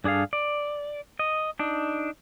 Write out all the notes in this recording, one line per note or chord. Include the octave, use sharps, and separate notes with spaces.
G2 D4 G#4 A4 F5
D5
D#5
D4 D#4